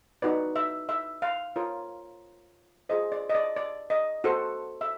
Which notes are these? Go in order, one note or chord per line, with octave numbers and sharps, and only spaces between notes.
D#4 F#4 B4 D5
E5
E5
F5
F4 A#4 C#5
F4 G#4 C5 D#5
D5
D#5
D5
D5
D#5
F#4 A4 C5
E5